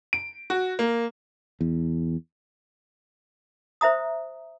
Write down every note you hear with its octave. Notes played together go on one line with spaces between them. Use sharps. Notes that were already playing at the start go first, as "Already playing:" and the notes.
D7
F#4
A#3
E2
C5 E5 A#5 D#6